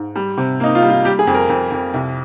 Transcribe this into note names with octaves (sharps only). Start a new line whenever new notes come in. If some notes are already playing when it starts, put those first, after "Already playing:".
Already playing: G#2
G3
C3
A#3 D#4
F4
G3
F4
G3 G4
G#4
F2
A#4
F2
F2
C2